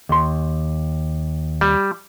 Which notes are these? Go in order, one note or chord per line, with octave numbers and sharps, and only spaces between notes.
D#2 C6
G3